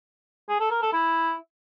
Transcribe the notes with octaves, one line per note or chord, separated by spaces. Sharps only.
G#4
A4
A#4
A4
E4